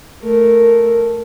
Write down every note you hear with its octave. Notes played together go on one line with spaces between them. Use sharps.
A3 A#4